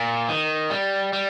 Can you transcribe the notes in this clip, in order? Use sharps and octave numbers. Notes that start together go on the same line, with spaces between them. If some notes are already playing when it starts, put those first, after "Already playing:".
Already playing: A#2
D#3
G3
G3